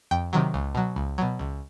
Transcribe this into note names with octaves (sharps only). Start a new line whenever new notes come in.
F2 G5
C3 D#3 F#3
C#2
B2 F#3
C#2
B2 F#3
C#2